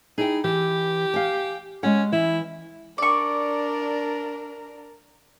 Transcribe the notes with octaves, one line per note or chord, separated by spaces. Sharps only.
D#4 E4 G#4 G5
E3 G4
F5 G#5
G#3 C#4 F#5
E3 E4
D4 A#4 D5 C#6